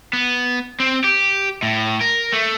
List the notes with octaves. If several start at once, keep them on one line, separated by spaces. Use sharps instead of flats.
B3
C4
G4
A2
A#4
A3